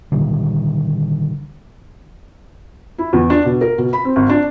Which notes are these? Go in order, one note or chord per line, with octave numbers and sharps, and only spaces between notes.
A#2 D3 D#3 G3
E4
E2
D4
B2
A#4
B2
B5
C4
G#1
D4